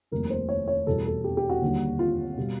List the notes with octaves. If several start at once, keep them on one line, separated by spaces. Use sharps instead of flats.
F1 D#2 D#3 G3 A#4
C5
C#5
C#5
E2 B2 G3 A4
A4
G4
G4
F#4
D#2 D3 G3
F4
B2 G3